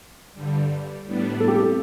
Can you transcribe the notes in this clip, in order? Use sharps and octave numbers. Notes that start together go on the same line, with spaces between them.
G2 D3 G3
A2 G3 B3 D4
A4
G4
A4